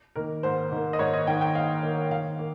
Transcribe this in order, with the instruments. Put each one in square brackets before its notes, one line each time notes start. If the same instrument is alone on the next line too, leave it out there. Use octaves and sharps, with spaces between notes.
[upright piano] D#3 A#3 A#4
G#2 C5
D#3 A#3
D#5
G#2 C#5
D#5
D#3 A#3 G5
G5
G#2 F5
D#3 A#3
D#3 F5
A#3